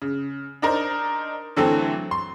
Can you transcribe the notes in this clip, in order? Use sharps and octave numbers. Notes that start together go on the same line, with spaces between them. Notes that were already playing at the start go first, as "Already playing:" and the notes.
C#3
D4 D#4 A#4 C5
D3 E3 F#3 A3 C4 A4
C6